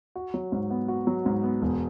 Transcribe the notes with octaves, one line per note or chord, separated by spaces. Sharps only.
F#4
F#3
G#2
B3
F#4
F#3
G#2
B3
E1